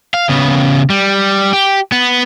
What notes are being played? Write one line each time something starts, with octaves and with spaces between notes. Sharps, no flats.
F5
C#3 B3
G3
G4
B3